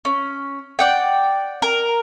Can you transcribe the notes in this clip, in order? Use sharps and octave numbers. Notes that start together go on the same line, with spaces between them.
C#4
D5 F#5 G5
A#4